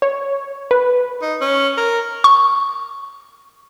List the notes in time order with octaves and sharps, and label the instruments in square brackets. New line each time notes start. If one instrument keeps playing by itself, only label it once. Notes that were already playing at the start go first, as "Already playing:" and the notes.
[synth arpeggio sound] C#5
B4
[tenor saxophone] D#4
C#4
A#4
[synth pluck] C#6